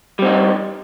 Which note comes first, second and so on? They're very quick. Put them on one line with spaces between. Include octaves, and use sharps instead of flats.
G3 C4 D#4